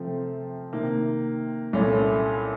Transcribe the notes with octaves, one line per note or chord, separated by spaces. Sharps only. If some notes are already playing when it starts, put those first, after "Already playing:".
Already playing: C3 F3 A3 C4 F4
C3 D#3 A#3
C2 A#2 A3 C#4